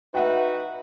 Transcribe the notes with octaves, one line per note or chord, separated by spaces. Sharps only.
D#4 F#4 B4 E5 F#5 G5